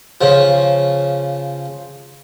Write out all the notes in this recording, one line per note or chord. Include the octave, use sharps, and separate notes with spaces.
C#3 F3